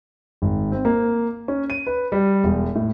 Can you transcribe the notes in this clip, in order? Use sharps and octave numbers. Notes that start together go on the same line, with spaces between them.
G#1
C4
A#3
C#4
D#7
B4
G3
E1
A2